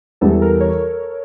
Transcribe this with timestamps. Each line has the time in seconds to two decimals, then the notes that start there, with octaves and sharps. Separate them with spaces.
0.21 E2 E3 G3 A4
0.42 A#4
0.60 C#5